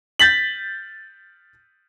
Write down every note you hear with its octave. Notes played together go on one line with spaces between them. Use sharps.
G6 A6 B6 F#7